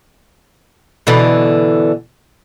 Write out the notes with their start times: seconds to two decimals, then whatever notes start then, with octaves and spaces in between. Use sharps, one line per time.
1.07 B2 D3 E3